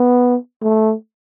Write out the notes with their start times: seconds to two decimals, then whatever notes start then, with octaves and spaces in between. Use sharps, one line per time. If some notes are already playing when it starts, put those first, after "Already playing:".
Already playing: B3
0.62 A3